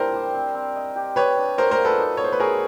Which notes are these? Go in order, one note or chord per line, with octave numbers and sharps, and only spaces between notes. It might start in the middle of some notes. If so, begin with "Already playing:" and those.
Already playing: G3 C4 D4 E4 A#4 C5
G4
C4
C4
D#5
G4
G4 B4 C#5
D4
F#3 A#4 C5
A#4 C5
F4
A4 B4
D#4
B3 C#5
C5
B4
F#4 G#4 A#4